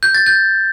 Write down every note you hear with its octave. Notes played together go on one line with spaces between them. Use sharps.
G6
A6
G6